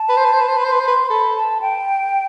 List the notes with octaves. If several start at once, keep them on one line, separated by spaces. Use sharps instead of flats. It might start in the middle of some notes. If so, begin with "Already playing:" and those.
Already playing: A5
B4
C5
B4
C5
B4
C5
B4
C5 C6
B4
C5
B4 C6
A4 B5
A5
G5